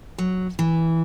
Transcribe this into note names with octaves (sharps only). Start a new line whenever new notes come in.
F#3
E3